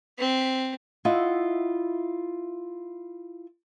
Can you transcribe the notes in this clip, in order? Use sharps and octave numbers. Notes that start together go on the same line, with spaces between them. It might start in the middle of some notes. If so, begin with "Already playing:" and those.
C4
E4 F4 D#5 E5 F#5